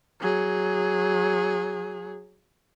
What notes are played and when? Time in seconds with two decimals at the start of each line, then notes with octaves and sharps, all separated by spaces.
0.20 F#3 G#4